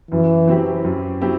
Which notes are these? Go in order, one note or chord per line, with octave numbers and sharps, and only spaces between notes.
F#2 E3
F#3 C4 E4 G4
F#2
F#3 C4 E4 G4